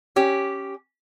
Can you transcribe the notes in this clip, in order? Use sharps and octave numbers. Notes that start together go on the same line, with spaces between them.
C#4 G4